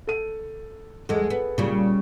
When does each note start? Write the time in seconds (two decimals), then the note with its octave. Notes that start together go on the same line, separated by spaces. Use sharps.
0.07 A4 D#7
1.09 E2 G#3 G#4 A4
1.30 B3
1.58 A#2 C#3 G3